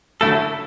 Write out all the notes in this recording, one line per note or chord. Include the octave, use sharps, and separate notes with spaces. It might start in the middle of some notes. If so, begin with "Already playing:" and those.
D3 F#3 A3 E4 A4